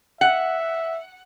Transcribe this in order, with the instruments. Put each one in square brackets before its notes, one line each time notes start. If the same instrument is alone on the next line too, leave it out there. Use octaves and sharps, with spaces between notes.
[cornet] E5 [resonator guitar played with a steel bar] F#5